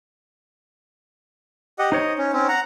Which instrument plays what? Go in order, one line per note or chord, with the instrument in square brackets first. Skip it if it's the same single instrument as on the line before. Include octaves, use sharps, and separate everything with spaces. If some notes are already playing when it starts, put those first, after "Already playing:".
[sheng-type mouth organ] G4 D#5 F#5
[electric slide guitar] D#4 C5 C#5 [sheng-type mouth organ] D#5
[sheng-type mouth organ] C#4
C4 C#4
F#5 A#5